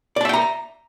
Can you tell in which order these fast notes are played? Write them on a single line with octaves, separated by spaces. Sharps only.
D5 A5 E5 G5 A#5